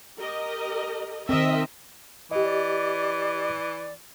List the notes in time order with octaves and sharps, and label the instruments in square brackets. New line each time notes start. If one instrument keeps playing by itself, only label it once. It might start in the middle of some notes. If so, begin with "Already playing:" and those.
[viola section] G4 A#4 D#5
[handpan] D#3 C4 [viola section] A#4 D#5 E5
[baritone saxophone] E3 [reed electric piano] G4 D#5
[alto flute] D5